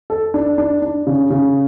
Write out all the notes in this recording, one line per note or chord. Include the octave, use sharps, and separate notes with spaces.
A4
D4
D4
D4
C#3
C#3